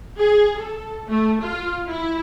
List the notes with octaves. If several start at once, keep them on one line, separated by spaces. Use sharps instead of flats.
G#4
A4
A3
F4
E4